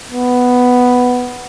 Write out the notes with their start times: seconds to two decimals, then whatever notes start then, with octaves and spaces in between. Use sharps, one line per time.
0.12 B3